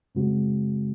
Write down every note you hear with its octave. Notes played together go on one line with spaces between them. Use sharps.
F#2 C#3 G#3 C4 F#4